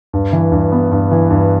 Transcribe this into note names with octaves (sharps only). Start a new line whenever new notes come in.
G2
E3
G2
B3
G2
E3
G2